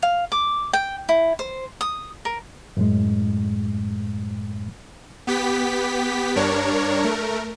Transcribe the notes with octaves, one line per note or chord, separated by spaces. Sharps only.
F5
D6
G5
E4
C5
D#6
A#4
F#2 A2 G#3
B3 G4 B6
G2 D4 A#4 C#5
A3 A#4